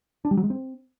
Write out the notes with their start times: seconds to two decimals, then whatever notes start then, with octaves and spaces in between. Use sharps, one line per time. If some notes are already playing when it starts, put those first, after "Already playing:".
0.25 D4
0.31 G3
0.37 F#3
0.44 G#3
0.50 C4